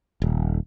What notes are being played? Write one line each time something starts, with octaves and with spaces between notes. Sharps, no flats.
D#1